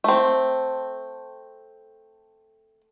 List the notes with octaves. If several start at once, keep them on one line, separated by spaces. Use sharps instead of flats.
A3 C4